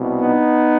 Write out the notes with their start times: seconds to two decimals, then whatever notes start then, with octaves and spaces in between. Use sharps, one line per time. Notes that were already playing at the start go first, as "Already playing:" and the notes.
Already playing: C2 B2
0.22 B3 D#4